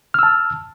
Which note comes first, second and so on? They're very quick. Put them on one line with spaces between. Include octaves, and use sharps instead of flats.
F6 E6 A5